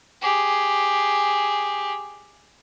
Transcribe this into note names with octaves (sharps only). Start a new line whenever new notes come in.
G4 G#4